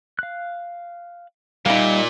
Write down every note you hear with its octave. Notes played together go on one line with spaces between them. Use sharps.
F5 F#6
A#2 G3 D#4 E5 F5